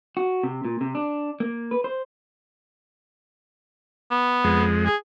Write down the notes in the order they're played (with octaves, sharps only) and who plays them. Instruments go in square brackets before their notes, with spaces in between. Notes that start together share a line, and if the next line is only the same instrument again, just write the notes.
[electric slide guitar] F#4
C3
A#2
C3
D4
A#3
B4
C5
[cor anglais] B3
[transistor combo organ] F2 G#3
[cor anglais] G#4